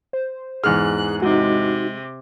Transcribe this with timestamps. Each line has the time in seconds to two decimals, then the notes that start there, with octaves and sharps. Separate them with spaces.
0.13 C5
0.64 E2 G#2 G#4 F6 F#6
1.22 C3 G#3 D#4 F#4